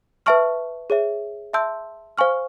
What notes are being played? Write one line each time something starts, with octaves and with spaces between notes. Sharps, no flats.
B4 E5 A5 C#6 F6
G#4 C#5 E5
E5 A5 C6 E6 G6
C5 F5 G#5 C#6 F6